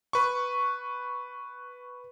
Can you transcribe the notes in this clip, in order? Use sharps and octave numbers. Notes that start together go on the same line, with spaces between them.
B4 C#6